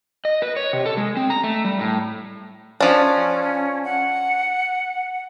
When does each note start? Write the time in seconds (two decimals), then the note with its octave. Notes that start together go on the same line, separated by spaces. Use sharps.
0.25 D#5
0.42 B4
0.56 C#5
0.73 C3
0.86 A4
0.97 G#3
1.17 C4
1.30 A#5
1.44 A3
1.65 G3
1.79 A2
2.80 F3 C#4 D4
3.84 F#5